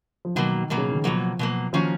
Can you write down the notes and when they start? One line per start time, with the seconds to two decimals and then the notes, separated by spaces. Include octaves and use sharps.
0.25 F3
0.35 B2 D#3 F#3 A#3
0.70 B2 F#3 A#3
0.78 C#3
0.92 D#3
1.04 B2 F3 F#3 A#3
1.39 B2 F#3 A#3
1.73 D#3 F3 A#3 C#4 F#4